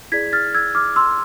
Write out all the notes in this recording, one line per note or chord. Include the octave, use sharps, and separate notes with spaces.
E4 G#4 D5 G#6 B6
F6 A6
E6 G#6
D6 F6
C6 E6